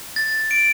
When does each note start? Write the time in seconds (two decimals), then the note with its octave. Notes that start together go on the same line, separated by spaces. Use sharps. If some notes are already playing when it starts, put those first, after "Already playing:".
0.16 A6
0.51 D7